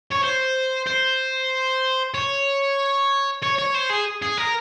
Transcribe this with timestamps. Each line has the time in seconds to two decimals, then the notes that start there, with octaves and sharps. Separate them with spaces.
0.11 C#5
0.23 C5
0.86 C5
2.14 C#5
3.42 C#5
3.58 C#5
3.74 C5
3.90 G#4
4.22 G#4
4.38 A#4